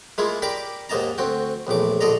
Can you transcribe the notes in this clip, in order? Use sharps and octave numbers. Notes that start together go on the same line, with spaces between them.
G#3 A#3 E4 F4 G#4
G4 A#4 D5 B5 D6
D#2 G#2 A#3 D#5 A5 A#5
D2 C4 F#4 G5
A#1 E2 A2 D6
A#1 D3 A4 D5 D#5 A#5